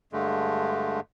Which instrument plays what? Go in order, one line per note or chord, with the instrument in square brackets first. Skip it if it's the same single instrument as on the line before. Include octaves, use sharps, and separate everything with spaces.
[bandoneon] G2 D3 G#3 A3